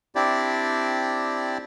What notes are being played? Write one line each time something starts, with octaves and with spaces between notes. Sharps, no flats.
C4 D4 E4 G4 D5